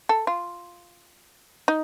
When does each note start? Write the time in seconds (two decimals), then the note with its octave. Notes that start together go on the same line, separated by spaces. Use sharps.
0.09 A4
0.27 F4
1.68 D#4